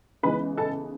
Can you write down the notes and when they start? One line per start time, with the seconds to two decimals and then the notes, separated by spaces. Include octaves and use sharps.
0.23 C#3 E3 G#3 B3 D#4 B4 B5
0.57 A4 A5